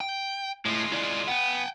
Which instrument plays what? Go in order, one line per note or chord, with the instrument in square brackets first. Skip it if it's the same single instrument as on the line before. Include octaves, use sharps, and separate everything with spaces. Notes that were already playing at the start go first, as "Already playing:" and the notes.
[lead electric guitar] G5
[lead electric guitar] A2 [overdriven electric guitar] G#3 F4
[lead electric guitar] E4 D5
[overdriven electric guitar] B3 [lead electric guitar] F#5 G5